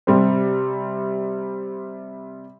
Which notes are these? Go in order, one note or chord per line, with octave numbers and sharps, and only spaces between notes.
C3 G3 C4